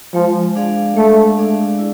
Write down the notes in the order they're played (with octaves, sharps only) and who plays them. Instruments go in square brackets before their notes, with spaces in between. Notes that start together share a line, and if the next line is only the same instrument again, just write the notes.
[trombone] F3 [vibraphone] G#3
[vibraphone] D4 G#4 D5 F5
[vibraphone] G#3 [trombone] A3
[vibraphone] D4 G#4 D5 F5
E4